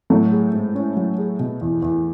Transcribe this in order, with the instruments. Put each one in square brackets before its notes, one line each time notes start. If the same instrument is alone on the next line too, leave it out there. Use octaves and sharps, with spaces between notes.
[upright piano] A2 A3 [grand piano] F#3
[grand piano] G#4
G#2
C#4
F#3
G#4
B2
E2
E2